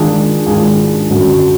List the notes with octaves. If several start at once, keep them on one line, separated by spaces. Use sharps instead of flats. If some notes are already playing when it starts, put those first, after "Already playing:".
Already playing: D#3 G#3 D4 F4 G#4
D#3 G#3 D4 F4 G#4
F#2 D3 F#3